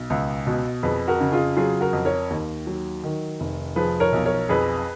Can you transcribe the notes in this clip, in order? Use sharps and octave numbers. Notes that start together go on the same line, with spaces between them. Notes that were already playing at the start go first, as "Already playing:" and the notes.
Already playing: B1
C#2
B2
F2 G#4 B4
F#4 A#4
C#3
F4 G#4
F#3 F4 G#4
F#4 A#4
F2
A#4 C#5
D#2
F#3
D#3
F1
F3 G#4 B4
A#4 C#5
B1
A#4 C#5
F2 G#4 B4